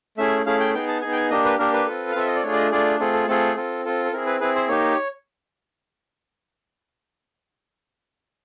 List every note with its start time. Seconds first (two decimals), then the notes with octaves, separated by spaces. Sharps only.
0.17 A3 C#4 E4 G#4 E5
0.46 A3 C#4 E4 G#4 F5
0.60 G5
0.74 B3 D#4 G#4 G5
0.88 A5
1.01 B3 D#4 G#4 G#5
1.12 G5
1.17 G#5
1.30 A#3 D4 G4 D#5
1.45 B4
1.59 A#3 D4 G4 A#4
1.73 B4
1.86 C4 F4 A4
2.11 F5
2.15 C4 F4 A4 E5
2.27 D#5
2.35 D5
2.43 A3 D4 F4 G#4 C#5
2.52 D5
2.57 D#5
2.71 A3 D4 F4 G#4 D5
3.00 A3 C4 F4 G#4 A4
3.13 A4
3.27 A3 C4 F4 G#4 A4
3.56 C4 F4 A4
3.85 C4 F4 A4
4.05 A4
4.12 C4 E4 G#4 A#4
4.26 B4
4.40 C4 E4 G#4 B4
4.55 C5
4.68 A#3 D#4 G4 C#5